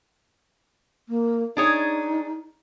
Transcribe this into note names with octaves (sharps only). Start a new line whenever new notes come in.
A#3
D4 D#4 G#4 C#5